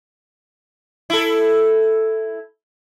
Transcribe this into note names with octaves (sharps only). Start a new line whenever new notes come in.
E4 A4